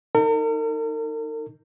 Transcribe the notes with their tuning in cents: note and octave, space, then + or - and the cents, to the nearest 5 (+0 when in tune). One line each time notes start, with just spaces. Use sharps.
D#4 +0 A#4 -45